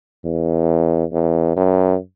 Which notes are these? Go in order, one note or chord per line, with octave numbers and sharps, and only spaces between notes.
E2
E2
F#2